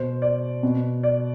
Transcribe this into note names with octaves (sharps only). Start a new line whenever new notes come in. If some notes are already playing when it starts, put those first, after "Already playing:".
Already playing: B2 C5
D5
B2
D5